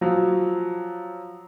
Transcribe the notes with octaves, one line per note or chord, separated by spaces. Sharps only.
F3 F#3